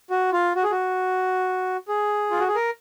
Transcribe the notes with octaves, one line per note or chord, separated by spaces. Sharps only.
F#4
F4
F#4
G#4
F#4
G#4
F4
F#4
G#4
A#4